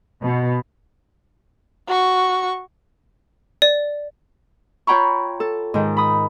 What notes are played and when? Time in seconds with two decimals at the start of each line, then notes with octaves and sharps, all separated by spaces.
0.21 B2
1.88 F#4 C#6
3.62 D5
4.87 F4 C#5 G5 A#5 B5 C#6
5.40 A4
5.74 G#2 D#3
5.97 B5 D#6